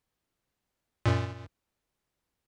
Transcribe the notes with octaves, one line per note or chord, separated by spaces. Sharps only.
F#2 A#2